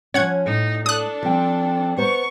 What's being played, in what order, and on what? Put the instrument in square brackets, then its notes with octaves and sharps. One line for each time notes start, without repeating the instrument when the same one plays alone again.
[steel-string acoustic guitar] F3 C#4 [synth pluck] C#5 F#5 G#6
[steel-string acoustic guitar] A2 [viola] D#4
[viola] D4 A4 [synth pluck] D#6 F#6
[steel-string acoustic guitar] F3 C4 G5
[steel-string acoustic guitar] B3 C5 A#5 [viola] C#6